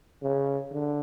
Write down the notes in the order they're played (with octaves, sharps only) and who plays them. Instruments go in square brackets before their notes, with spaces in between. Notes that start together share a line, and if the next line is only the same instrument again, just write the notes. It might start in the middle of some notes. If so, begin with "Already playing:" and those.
[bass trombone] C#3
D3